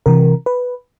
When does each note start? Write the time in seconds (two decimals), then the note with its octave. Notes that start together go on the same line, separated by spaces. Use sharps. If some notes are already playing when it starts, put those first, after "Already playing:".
0.06 C3 E3 A#4
0.46 B4